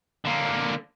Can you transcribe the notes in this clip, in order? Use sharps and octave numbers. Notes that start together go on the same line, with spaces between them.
D3 A#3